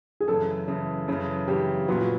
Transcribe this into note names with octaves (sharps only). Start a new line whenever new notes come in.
G#4
F#2 C#3 E3 A4
F#2 C#3 E3
F#2 C#3 E3
F#2 C#3 E3 G4
A#2 F#3 B3 F#4
F4